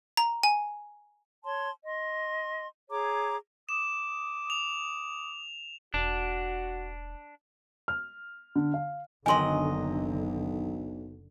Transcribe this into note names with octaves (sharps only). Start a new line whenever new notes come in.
A#5
G#5
C#5 A5 C6
D#5 C6
G#4 C#5 A#5 D6
D6 D#6 E7
F7
E1 D4 F#4
F6
D3
F5
F#1 B1 D3 D#3 F#3 D#5 G#5 C6